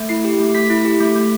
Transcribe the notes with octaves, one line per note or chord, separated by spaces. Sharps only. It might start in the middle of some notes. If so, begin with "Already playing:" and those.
Already playing: A3
E4 C7
G4
A3
A3 B6
E4
G4
A3
A3